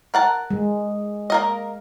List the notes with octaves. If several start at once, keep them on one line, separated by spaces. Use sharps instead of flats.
A#4 F#5 A5
G#3
A#3 A#4 D#5